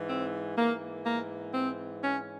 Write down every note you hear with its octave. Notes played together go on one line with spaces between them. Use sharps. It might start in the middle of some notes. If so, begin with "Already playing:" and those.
Already playing: G#2 E3
C4
G#2 E3 A#3
A#3
C4
C#4